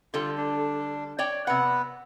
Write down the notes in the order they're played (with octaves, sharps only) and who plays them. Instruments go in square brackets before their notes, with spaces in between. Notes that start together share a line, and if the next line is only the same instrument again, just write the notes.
[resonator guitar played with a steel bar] D3 G3 A4 [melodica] F4
[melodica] D4
[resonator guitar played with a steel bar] C#5 D5 G5
[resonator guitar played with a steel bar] C3 F#5 [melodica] B3 B4